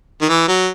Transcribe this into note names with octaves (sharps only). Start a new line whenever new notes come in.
D#3
E3
F#3